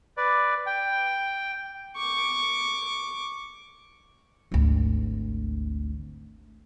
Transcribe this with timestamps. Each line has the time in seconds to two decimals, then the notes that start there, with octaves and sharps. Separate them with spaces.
0.17 B4 D5
0.66 G5
1.96 C#6 D6
4.52 G#1 D2